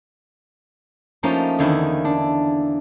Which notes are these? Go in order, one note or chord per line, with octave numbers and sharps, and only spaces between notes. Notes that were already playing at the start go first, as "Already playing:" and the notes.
F3 A3 A#3 C#4 D#4
E2 D3 D#3 E4
D4